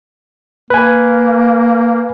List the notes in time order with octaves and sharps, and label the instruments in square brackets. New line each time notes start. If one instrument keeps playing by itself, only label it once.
[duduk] A#3 [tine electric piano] B4 G#5